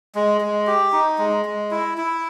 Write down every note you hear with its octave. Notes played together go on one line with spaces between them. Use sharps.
G#3
G#3
G4
D#4
G#3
G#3
E4
E4